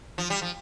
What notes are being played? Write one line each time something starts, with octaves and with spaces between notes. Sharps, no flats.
F3
G3
F3